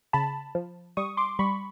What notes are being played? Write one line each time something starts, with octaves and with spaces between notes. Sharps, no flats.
C#3 A5 B5
F3
G3 C#6 D#6
C6 D6
G3 B5 C#6